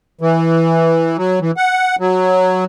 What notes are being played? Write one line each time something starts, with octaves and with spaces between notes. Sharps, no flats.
E3
F#3
E3
F#5
F#3